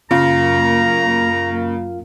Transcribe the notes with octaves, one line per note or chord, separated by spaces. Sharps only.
F#2 C#3 A#3 F4 F5 A#5